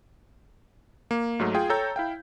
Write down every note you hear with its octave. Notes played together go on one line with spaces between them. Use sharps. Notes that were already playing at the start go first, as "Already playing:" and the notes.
A#3
G#2 F#3 A3
F4 G#4 G5
A4 C#5 G5 A#5 E6 G6
E4 F5 G5